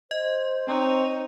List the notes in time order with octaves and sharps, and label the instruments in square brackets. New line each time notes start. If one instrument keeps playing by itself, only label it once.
[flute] C5 [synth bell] D#5
[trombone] C4 [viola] D#4 C#5